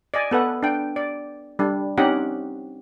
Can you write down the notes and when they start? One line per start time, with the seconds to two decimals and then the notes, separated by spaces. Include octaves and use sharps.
0.14 D5 D#5 G#5
0.31 B3 A4 B4 F#5
0.63 D4 G5
0.96 D5
1.59 G3 D4
1.98 C4 C#4 D#4 G4 F#5